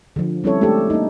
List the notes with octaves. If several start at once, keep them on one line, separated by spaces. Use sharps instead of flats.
D3 F3
G3 C4 C#4 E4 A4 C#5
G#3 A3 D4 G4 A4
A#3 D#4